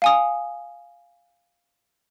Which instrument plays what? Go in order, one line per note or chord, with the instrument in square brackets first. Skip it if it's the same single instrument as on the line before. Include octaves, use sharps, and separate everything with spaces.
[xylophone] F5 G#5 D#6